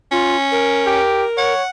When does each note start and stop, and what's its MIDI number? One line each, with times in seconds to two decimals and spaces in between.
0.12 1.00 61
0.12 0.36 65
0.52 1.54 70
0.87 1.25 67
1.38 1.62 73
1.38 1.70 78